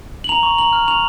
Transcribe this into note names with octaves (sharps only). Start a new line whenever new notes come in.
F#7
A#5 F7
C#6
A#5 F#7
F6
C#6 F7